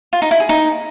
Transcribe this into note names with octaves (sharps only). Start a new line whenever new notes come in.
F4
D#4
E4
G#4
D#4